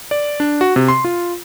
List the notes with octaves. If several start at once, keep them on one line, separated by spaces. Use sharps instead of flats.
D5
D4
F#4
C3
C6
F4